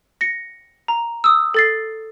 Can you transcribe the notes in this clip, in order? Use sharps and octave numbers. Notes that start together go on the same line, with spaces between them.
A#6 C#7
A#5
D#6 E6
A4 A6 C7